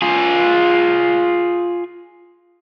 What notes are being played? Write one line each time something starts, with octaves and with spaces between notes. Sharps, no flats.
F4 G#4